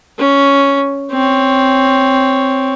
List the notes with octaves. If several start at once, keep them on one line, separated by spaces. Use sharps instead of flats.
C#4
C4 C#5